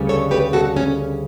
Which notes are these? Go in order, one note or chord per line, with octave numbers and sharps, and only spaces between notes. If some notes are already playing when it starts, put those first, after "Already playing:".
Already playing: D2 C#3 G3 B3
A4 C#5
G4 B4
F#4 A4
C#4